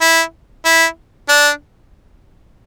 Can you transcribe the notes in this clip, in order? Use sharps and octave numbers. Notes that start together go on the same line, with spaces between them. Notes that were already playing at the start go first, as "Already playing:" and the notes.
E4
E4
D4